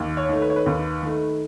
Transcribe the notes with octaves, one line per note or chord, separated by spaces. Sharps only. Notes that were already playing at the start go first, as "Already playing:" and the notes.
Already playing: D#2
C#5
D#3 A3
B4
C#5
B4
D#2
D#3 A3